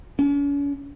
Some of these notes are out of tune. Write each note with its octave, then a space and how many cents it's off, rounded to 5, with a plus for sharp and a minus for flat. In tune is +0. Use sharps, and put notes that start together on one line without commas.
C#4 +40